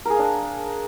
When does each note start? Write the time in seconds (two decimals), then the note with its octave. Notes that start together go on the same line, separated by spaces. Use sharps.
0.05 A#4
0.10 G#4
0.14 F5
0.19 D4